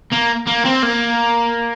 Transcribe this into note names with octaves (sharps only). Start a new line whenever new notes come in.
A#3
A#3
C4
A#3